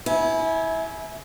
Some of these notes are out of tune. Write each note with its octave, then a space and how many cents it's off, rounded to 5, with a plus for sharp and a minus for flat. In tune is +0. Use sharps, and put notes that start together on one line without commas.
E4 -20 G#5 +25